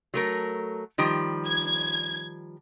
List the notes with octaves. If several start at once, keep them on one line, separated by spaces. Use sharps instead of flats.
F#3 A3 A#4
D#3 F3 G3
G#6